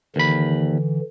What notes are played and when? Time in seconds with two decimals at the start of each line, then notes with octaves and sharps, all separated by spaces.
0.16 D#2 D3 E3 B5